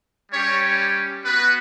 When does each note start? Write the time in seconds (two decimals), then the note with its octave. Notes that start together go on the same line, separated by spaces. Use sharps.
0.32 G3 C#4 G4 C#5
1.25 B3 F#4 B4